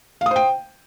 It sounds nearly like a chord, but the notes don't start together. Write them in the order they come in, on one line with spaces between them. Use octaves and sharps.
F5 D#6 C5 G5